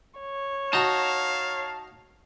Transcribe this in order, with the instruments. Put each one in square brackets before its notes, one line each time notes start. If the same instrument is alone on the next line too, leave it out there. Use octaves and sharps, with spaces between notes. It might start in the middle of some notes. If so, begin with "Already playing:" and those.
[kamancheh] C#5
[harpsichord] D#4 F#4 [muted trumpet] F5 [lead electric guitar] A5 A#5